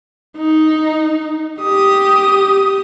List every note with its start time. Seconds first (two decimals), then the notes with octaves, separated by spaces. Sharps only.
0.37 D#4
1.61 G4 D#6